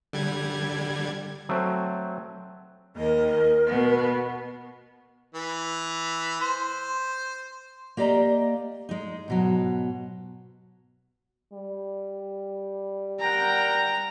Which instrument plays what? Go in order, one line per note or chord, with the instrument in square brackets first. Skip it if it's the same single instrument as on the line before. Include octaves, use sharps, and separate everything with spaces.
[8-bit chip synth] D3 G3 G#6
[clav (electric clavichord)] F#3 A3 C4
[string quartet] D#2 D#3 D#5 [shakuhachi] A#4
[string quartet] B2 B3
[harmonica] E3
C5
[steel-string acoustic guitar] A#3 G4 D5 D#5 A#5
G#3 D#4
G#2 B2 F#3
[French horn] G3
[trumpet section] A#4 F#5 G5 [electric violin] A#5